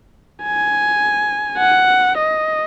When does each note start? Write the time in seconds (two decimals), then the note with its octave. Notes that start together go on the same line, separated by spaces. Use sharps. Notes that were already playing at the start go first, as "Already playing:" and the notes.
0.43 G#5
1.59 F#5
2.18 D#5